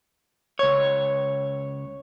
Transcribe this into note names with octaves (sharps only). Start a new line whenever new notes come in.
C#2 C#5